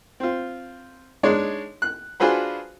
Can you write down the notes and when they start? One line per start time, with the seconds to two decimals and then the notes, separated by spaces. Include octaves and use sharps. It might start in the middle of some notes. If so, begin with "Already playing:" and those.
0.20 C4 F4
1.23 G#3 D4 D#4 C#5 D5
1.82 F#6
2.20 D4 F4 F#4 G#4 B4 C5